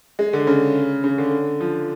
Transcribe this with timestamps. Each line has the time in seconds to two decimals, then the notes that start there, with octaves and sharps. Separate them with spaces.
0.19 G#3
0.33 D3
0.47 C#3
1.04 C#3
1.18 D3
1.60 F3